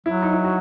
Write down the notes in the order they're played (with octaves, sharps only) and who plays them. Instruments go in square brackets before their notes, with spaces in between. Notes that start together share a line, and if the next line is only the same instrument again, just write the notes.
[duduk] F#3 [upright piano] E4
[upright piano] D#4
E4
F#4